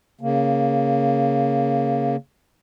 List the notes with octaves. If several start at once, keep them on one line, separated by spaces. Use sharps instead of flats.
C#3 A#3